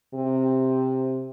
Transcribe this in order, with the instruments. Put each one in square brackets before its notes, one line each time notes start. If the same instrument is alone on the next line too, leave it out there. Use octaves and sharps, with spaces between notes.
[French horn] C3